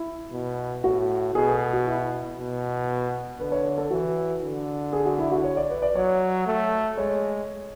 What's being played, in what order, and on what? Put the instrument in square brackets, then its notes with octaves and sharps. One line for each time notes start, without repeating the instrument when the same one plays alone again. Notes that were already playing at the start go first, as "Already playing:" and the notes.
Already playing: [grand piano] E4
[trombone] B2
[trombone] A2 [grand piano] F#4
[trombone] B2 [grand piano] G#4
[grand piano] A4
F#4
E4
[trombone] B2
[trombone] D3 [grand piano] B4
[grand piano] C#5
C#5
A4
[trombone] E3 [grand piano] F#4
[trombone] D3
[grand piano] G#4
F#4
E4
F#4
C#5
D5
B4
D5
[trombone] F#3 [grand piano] C#5
[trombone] A3
[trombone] G#3 [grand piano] C#5